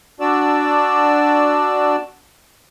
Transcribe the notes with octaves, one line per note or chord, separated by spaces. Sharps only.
D4 F#4 D5 E6